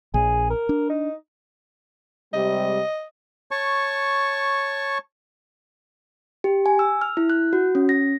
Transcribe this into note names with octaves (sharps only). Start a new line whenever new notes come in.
A#1 G#4
A#4
D4
D#4
C3 G3 G#3 D#5
C#5 A5 C#6
G4
G#5
E6
F6
E4
F#6
F#4
C#4
A#6